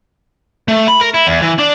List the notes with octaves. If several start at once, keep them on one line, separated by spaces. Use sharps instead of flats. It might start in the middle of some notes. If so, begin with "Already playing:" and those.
A3
B5
A#4
E4
E2
E3
D4